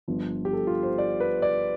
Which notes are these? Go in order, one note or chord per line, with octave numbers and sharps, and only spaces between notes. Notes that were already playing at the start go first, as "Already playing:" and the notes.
G1 G2 F3
G4
A4
F4
C5
D5
B4
D5